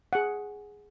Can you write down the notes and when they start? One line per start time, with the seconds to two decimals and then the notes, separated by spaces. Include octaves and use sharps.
0.13 G#4 F#5